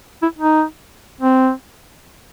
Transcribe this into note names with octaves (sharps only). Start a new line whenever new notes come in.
E4
D#4
C4